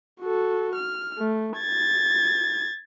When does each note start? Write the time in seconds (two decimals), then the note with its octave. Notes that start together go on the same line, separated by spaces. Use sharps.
0.21 F#4 A4
0.76 F6
1.18 A3
1.58 G#6 A6